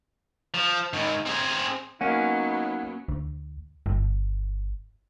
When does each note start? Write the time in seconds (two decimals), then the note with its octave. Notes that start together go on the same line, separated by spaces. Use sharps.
0.54 F3
0.93 G#2 D#3
1.26 C4 G#4
2.01 F#3 A#3 B3 C#4 D#4 F#5
3.08 D2
3.86 G1